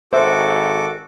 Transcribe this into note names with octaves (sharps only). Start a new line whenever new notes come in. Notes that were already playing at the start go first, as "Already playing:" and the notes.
G#1 F#4 A4 C5 E5 D6